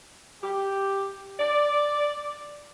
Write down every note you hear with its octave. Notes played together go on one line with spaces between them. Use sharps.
G4
D5